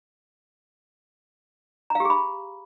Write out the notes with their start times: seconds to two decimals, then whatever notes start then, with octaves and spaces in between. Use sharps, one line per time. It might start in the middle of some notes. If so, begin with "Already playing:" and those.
1.90 A#5
1.95 F5
2.00 G4
2.05 G#4
2.10 B5